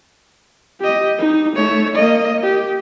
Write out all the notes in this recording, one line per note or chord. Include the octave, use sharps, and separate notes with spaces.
G4 D#5
D#4
A3 C#5
A#3 D#5
G4